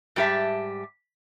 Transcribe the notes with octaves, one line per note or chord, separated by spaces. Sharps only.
G#2 G3 G4 A4 E5 A5